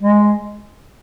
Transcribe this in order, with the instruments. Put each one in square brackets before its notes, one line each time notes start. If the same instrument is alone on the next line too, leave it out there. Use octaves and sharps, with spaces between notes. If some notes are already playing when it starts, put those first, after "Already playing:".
[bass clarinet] G#3